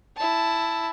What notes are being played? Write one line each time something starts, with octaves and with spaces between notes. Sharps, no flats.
E4 A5